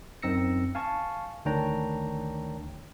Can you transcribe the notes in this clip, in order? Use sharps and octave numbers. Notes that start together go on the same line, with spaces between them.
F#2 C4 D#4 E6 A#6 C#7
F5 G#5 A5 C#6
D2 D#3 D4 C#5 G5 A#5